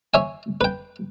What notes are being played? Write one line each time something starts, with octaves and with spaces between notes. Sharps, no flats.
C#5 E5 G#5
B4 G5